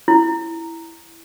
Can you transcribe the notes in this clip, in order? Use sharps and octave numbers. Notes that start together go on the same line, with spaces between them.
E4